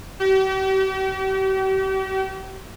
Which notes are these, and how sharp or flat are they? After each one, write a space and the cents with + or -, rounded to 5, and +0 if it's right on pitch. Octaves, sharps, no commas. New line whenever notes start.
G4 -40